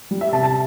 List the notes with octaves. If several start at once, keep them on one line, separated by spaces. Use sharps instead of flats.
G3
E5
C3 A5
A5